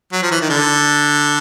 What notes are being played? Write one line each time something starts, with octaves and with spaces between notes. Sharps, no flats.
F#3
F3
E3
D#3
D3